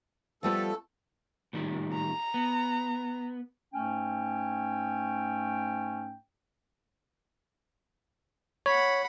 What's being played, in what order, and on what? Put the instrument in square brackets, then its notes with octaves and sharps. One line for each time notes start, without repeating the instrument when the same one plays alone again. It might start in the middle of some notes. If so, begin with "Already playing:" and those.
[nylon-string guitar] F3 G3 B3 [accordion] A3 A4
[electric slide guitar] A2 D#3 G3
[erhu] A#5
[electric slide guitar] B3
[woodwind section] G#2 A3 C#4 G5
[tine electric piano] C#5 [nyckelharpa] F#5 B5